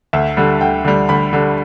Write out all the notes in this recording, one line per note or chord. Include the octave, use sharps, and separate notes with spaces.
D2 E5
D3 G3
D2 G5
D3 G3
D2 B5
D3 G3